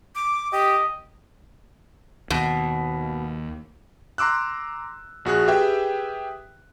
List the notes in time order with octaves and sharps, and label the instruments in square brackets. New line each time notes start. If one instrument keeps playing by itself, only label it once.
[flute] D6
[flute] G4 [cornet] D#5
[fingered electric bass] D#2 [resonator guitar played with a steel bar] B2
[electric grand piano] A#5 C6 D6 E6 F#6
A#1 F#4 G#4 F#6
G4 G#4 B4 E5 G5